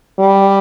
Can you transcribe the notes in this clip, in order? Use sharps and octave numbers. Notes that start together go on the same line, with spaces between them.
G3